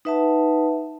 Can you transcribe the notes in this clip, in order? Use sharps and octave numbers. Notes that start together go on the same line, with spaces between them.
D#4 B4 E5 F#5 A5